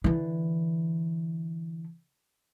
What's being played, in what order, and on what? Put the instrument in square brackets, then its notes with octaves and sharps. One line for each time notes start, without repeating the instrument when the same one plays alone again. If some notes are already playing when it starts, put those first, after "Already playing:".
[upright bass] D3 E3